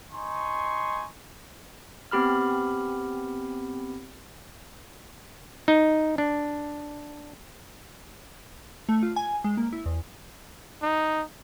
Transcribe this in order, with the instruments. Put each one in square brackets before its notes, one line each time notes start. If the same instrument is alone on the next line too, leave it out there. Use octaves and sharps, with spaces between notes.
[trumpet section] D#4 G#5 C6 C#6
[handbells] B3 C4 G4 B5 F6
[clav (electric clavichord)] D#4
D4
[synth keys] A3
F4
G#5
G#3
A#3
E4
E2
[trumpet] D#4